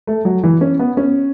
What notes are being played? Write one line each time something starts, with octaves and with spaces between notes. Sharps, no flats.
A3
F#3
E3
C#4
B3
C#4